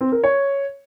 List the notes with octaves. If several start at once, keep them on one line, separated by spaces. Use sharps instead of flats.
C4
A#4
C#5